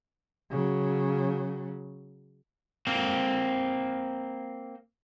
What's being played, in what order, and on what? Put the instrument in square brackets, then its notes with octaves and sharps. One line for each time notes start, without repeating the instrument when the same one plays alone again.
[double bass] C#3 F#3
[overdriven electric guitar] A#3 C4